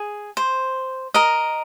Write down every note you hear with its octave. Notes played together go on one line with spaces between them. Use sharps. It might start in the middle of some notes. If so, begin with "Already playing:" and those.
Already playing: G#4
C5
A#4 D#5